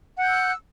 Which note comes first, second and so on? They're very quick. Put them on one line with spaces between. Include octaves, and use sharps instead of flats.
F#5 G6 E6 F#6